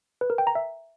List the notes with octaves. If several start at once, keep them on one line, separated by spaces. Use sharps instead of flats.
B4
A#4
G5
A#5
E5